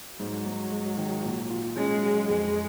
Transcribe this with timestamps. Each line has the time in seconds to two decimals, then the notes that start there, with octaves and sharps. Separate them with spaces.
0.20 G#2 F#3
0.46 G#2
0.72 G#3
0.98 D#3
1.24 A#2
1.50 F4
1.77 G#3 C#4
2.02 F#3
2.29 F2 G#3